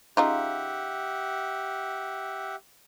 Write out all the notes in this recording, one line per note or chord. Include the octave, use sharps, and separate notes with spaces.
C#3 D#4 F4 G4 E5 F#5